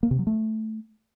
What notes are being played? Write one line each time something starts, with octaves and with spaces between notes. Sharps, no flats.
A#3
C3
F#3
A3